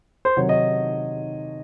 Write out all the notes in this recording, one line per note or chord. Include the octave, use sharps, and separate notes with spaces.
C5
C3 D#3 F#3 C#5
D#5